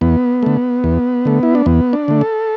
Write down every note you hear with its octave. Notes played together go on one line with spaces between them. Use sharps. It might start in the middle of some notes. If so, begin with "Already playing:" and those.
E2 B3
D3 A3
E2
D3 A3
E4
D4
E2 B3
D4
D3 A3
A4